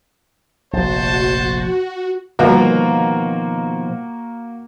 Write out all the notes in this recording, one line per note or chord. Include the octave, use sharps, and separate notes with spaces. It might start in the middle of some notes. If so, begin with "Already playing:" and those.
F1 A#1 F#4 C5 A5
B2 D3 D#3 F3 G3 A#3 F#4 A#4